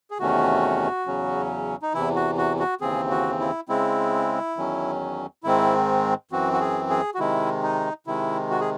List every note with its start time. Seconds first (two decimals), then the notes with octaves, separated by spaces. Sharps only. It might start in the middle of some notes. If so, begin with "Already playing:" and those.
0.11 G#4
0.19 E2 C3 D#3 A3 C#4 F#4
1.06 E2 C#3 F#3 C#4
1.82 D#4
1.94 E2 C3 E3 E4
2.16 F#4
2.38 F#4
2.59 F#4
2.81 D#2 C#3 E3 C4 G#4
3.10 F#4
3.40 E4
3.69 C#3 G#3 C4 E4
4.56 E2 D#3 F#3 C#4
5.43 G#2 D#3 G#3 C4 E4
6.31 F#2 E3 C4 F#4
6.53 F#4
6.60 G#4
6.90 G#4
7.14 F#4
7.19 C3 D#3 G#3 E4
7.63 D#4
8.07 C3 D#3 G#3 E4
8.50 F#4
8.60 G#4